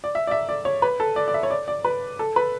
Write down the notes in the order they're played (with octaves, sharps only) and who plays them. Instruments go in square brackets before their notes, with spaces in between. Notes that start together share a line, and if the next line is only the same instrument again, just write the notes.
[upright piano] D5
E5
D5
E5
D5
C#5
B4
A4
D5
D5
E5
C#5
D5
D5
B4
A4
B4